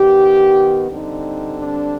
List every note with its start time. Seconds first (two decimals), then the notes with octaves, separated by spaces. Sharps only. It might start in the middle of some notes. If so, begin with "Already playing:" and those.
Already playing: D#3 B3 G4
0.89 D3 G3 C4 D#4
1.58 D4